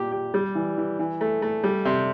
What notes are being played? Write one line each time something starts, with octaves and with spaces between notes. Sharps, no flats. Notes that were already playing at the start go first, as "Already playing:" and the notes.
Already playing: A#2 G4
G4
G3
E3
E3
E3
A3
A3
G3
C3